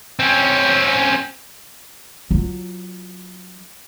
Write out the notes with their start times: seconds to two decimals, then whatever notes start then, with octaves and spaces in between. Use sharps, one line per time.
0.19 C4 C#4
2.31 F#3 F4